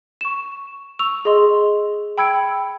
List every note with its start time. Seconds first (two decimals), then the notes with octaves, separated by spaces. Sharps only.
0.21 C#6 E7
0.99 C#6 E6 F7
1.25 G#4 D#5 C6
2.18 G5 B5 E6 G#6 C#7 D7